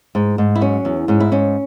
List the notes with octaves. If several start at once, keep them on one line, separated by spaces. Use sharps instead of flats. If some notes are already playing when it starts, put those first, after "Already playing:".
G#2
G#2
E4
F#3 C#4
E2
G#2 C#4
E4
G#2 C#4